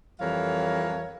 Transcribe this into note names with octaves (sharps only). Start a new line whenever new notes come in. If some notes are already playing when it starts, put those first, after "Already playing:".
F2 E3 G3 A#4 C#5 F5